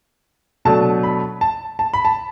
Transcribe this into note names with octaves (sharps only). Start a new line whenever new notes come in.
B2 F#3 A3 D4 A5
B5
A5
A5
B5
A5